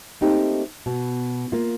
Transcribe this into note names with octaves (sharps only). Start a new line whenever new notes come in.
A3 A#3 C4 D#4 G4
B2
A#3 F4